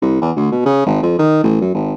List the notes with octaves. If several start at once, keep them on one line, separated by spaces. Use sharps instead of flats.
C2
E2
D2
B2
C#3
G#1
F2
D#3
A1
F#2
G#1